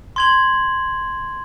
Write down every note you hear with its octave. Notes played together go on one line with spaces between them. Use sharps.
C6 G#6 F#7